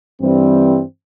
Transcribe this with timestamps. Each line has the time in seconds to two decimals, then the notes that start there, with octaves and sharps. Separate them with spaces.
0.21 G2 E3 G3 C4